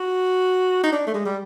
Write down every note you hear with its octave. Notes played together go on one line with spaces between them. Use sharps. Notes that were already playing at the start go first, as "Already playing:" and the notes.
Already playing: F#4
D#4
D4
A3
G#3
G3